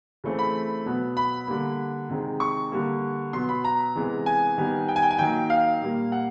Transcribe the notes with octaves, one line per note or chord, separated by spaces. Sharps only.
C#3 E3 A3 C4
B5
B2 F#3 B3
B5
D3 G3 A#3
C3 D#3 G#3
C#6
D3 G3 A#3
B2 F#3 B3 C6
B5
A#5
C3 E3 G#3 B3
G#5
D#3 G3 B3
G5
G#5
G5
G#5
D#3 F#3 A#3 G5
F5
A#2 G3 A#3
F#5